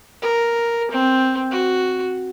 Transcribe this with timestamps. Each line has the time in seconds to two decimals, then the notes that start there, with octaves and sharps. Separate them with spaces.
0.22 A#4
0.91 C4
1.51 F#4